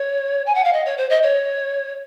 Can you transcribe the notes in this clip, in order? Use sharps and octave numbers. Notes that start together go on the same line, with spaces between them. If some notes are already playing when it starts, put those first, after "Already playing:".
Already playing: C#5
G#5
F#5
F5
D#5
C#5
C5
D#5
C#5